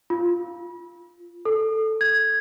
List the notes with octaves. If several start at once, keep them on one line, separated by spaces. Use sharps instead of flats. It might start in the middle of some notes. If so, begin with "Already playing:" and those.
F4
A4
G#6